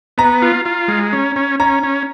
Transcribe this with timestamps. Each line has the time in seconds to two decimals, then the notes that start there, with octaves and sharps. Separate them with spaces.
0.18 B3 A#5
0.42 F4
0.65 F4
0.88 G#3
1.13 C#4
1.36 C#4
1.60 C#4 A#5
1.83 C#4